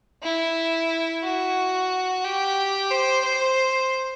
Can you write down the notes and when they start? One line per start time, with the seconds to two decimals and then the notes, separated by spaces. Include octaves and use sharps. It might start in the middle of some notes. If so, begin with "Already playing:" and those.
0.23 E4
1.23 F#4
2.24 G4
2.91 C5
3.24 C5